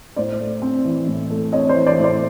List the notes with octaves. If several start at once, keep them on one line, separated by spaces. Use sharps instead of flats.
A2 C5 D5
A3
C4
E3
A2
A3
C4 C#5 D#5
C5 D5
E3
C5 D5
A2
C5 D5